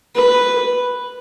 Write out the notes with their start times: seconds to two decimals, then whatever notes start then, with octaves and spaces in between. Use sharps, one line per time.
0.15 B4